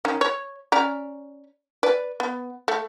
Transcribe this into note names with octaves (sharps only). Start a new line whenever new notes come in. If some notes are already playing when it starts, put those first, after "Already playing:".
D#3 C#4
C#5
C#4 D5 A#5
B4 D5
B3
A3